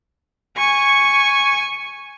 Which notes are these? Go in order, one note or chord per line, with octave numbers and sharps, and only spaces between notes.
G#5 C#6